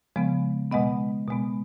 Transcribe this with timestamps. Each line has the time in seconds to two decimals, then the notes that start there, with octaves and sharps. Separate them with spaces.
0.16 C#3 F3 G#3 B3
0.72 B2 G#3 B3 D#5 F#5
1.28 B2 G#3 B3